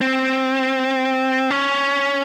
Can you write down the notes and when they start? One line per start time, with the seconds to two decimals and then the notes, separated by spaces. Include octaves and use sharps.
0.01 C4
1.50 C#4